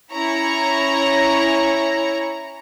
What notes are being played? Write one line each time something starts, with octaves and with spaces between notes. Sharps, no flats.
C#4 E4 C#5 A#5 C#6